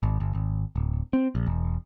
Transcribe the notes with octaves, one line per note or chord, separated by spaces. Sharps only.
G#1
G1
G#1
D1
C4
A#1
E1